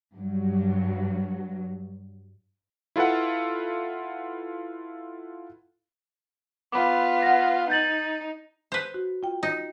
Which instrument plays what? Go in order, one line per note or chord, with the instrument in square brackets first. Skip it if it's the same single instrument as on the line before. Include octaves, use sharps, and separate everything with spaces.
[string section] G2 F#3
[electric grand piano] E4 F4 A4 B4 F#5
[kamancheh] B3 F4 [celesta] B5 D6
[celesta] F#5 A#6
[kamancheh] D#4 [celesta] G6 A6 F#7
[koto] B4 C5
[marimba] F#4
F4 G5
[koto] D#4